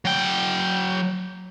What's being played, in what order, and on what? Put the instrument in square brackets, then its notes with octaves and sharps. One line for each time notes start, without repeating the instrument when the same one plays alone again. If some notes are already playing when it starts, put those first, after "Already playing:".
[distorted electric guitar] F#3 G5